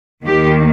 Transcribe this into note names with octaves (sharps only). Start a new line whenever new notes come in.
D#2 D#3 G4